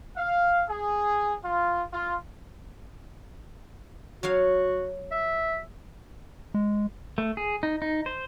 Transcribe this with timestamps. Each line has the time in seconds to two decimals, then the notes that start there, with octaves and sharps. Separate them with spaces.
0.16 F5
0.68 G#4
1.43 F4
1.91 F4
4.23 F#3 F#4 C#5 F5
5.11 E5
6.54 G#3
7.18 A3
7.37 G#4
7.63 D#4
7.82 D#4
8.06 C5